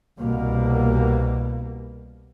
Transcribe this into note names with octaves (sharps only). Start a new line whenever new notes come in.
C2 B2 A#3